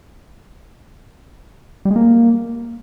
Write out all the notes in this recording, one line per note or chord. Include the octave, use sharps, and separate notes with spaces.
G3
G#3
A#3